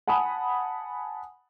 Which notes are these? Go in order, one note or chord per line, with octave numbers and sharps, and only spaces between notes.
F#5 G#5 A5 B5 D#6